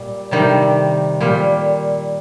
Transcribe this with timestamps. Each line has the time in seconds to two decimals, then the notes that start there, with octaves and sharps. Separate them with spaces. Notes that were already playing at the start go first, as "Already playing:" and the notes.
Already playing: A#2 G3
0.31 C3 D#3 G3
1.20 A#2 G3